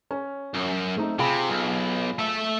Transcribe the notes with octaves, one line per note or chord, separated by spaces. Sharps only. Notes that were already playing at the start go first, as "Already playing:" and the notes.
C#4
F#2
A3 C4 D#4
C3 F4 G#4 B5
B1
A3 E5